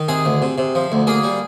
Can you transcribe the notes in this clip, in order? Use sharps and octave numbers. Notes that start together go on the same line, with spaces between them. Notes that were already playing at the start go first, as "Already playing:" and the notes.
Already playing: D#3
C3 G#4
D2
C3
C3
F3
D2
A#3 G#4
G3